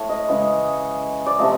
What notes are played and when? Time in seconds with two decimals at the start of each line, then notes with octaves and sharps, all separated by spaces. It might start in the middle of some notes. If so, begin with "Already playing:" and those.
Already playing: A2 A3 C#5
0.09 D#5
0.28 C#3 E3 G#3
1.26 D5
1.39 C3 F3 A3 D#5